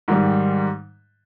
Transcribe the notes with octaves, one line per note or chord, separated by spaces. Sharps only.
G#2 D#3 G3